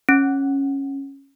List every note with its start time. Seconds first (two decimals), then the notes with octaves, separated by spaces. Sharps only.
0.09 C#4